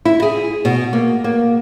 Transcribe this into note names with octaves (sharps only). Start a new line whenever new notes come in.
E4
G#4
B2
A#3
A#3